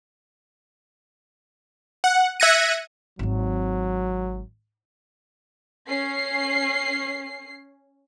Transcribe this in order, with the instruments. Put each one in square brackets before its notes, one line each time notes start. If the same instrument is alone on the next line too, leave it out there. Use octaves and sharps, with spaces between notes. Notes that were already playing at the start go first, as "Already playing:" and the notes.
[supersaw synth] F#5
E5 F#6 G#6 A#6 C#7 D#7
[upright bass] G#1 C4 [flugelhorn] F#3
[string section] C#4 C7